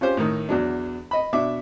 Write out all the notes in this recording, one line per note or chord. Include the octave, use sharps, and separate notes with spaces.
C#4 F4 G4 C5
A2 D#3
E2 F#3 D4
D#5 B5
B2 D4 E5 D6